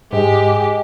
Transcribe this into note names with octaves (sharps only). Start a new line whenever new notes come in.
G#2 G#3 G4